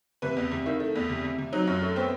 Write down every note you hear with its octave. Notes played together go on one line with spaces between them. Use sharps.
C3 B4
E2
C3
D#3 E4
A3
E2
C3
C3
C3
F#3 D#4
F#2
A3
B3 C4